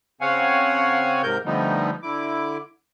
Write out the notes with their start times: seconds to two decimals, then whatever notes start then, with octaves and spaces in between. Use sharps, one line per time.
0.21 C#3 C4 C#5 F5 F#5 G#5
1.23 G#2 C3 A#4 G6
1.46 D3 F3 G3 A3 B3 D#4
2.03 D3 E4 D6